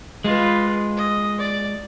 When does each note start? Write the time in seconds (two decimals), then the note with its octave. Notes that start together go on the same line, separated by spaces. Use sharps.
0.24 G#3 F4 B4
0.97 D#5
1.39 D5